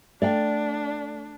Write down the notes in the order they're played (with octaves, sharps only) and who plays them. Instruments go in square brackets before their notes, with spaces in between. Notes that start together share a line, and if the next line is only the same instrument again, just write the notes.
[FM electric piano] A3 [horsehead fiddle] D4 [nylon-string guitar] D5 F5 G5